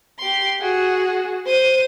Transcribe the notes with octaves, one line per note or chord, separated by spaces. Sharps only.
G4 C6
F#4 G#4
C5 D#7